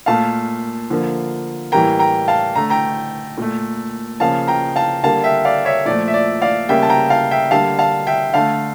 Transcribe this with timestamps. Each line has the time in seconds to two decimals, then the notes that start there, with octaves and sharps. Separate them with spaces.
0.06 A#2 A3 F5 A5
0.90 D3 F3 A#3
1.72 A2 E3 G3 A#3 G5 A#5
1.99 G5 A#5
2.28 F5 A5
2.55 D3 A3 A#5
2.70 G5 A#5
3.38 A#2 A3
4.20 C#3 F3 A#3 F5 A5
4.48 G5 A#5
4.76 F5 A5
5.03 D3 G3 A#3 F5 A5
5.24 E5 G5
5.45 D5 F5
5.65 C#5 E5
5.86 A#2 F3 A3 D5
6.08 E5
6.14 D5
6.42 D5 F5
6.69 C#3 G3 A#3 E5 G5
6.83 A5
6.90 G5 A#5
7.10 F5 A5
7.31 E5 G5
7.51 D3 G3 A#3 F5 A5
7.79 F5 A5
8.07 E5 G5
8.34 D3 A3 F5 A5